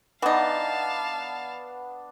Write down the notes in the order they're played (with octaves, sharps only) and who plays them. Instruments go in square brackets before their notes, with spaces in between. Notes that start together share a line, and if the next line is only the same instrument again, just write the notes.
[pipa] E3 D#4 [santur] B3 D4 [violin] F5 A5